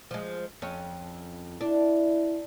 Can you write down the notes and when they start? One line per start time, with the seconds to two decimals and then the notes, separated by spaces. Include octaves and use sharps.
0.11 F3 G#3
0.62 F2 C#4
1.61 D4 E4